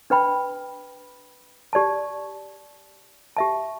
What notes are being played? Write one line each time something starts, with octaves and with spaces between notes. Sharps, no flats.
D4 B4 G5 B5
G4 D5 A5
G4 E5 A5